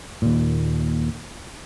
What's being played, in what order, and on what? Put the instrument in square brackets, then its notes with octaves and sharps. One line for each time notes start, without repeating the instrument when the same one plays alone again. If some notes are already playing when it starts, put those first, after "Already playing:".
[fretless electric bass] D#2 A#2